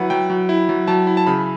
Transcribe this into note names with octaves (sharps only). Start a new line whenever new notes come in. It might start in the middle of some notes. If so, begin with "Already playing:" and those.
Already playing: F#3 E4 B4 F#5
F#3 G5
F#3
E4
F#3
F#3 A5
E4
A5
C#3 B5